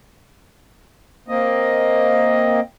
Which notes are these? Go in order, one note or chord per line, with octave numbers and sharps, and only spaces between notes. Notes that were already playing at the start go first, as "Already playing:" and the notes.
A#3 C4 D#5